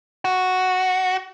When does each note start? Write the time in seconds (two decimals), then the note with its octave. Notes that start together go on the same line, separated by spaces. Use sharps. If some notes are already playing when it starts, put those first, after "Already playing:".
0.25 F#4